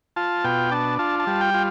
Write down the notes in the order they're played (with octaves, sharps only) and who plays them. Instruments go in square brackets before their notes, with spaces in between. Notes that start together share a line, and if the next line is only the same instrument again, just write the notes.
[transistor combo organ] F4 A5
B2 G5
D4 A5
F4 A5
A5
G3
G5
F4